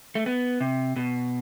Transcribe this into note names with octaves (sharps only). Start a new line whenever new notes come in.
A3
B3
C3
B2